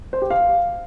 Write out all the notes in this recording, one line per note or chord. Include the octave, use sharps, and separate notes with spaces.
C5
G4
F5